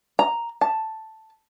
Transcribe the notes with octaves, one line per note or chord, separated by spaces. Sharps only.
A#5
A5